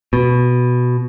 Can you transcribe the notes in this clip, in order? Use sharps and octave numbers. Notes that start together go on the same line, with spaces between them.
B2